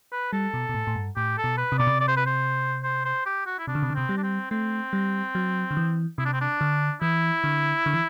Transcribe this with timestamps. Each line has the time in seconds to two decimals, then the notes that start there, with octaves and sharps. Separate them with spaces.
0.12 B4
0.33 G3 A4
0.54 B2
0.69 B2
0.74 A2
0.87 A2
0.96 G2
1.17 A2 G4
1.38 A4
1.44 B2
1.58 B4
1.72 C3
1.79 B2 D5
1.87 C3
2.00 D5
2.08 C5
2.17 B4
2.26 C5
2.84 C5
3.05 C5
3.26 G4
3.46 F#4
3.59 E4
3.67 C3 D4
3.75 D3
3.82 C3
3.90 D3
3.95 C3 C4
4.09 G3
4.18 D4
4.23 C4
4.51 A3 C4
4.93 G3
5.35 F#3
5.71 D3
5.77 E3
6.18 C3 E4
6.25 D4
6.34 C4
6.41 D4
6.61 D3
7.02 E3 E4
7.44 D3
7.86 D3
7.94 E3